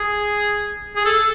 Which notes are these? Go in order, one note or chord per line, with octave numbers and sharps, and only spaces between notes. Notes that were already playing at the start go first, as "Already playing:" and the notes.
Already playing: G#4
G#4
A4